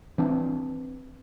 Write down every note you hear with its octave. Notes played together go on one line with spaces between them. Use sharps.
E3 C4 D4